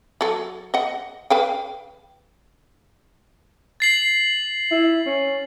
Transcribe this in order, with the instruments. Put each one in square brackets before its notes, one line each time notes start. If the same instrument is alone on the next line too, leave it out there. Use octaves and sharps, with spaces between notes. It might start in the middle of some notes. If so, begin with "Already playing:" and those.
[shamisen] F#3 A4
D#5 F#5
B4 F5 G5
[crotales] A6 C7 F#7
[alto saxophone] E4
C#4